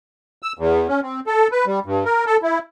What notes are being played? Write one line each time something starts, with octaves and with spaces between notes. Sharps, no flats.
E6
E2
C#4
C4
A4
B4
G3
G2
A#4
A4
E4